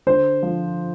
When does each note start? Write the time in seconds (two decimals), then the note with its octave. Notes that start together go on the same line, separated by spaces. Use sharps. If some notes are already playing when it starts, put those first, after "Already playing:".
0.07 D3 C5
0.43 F3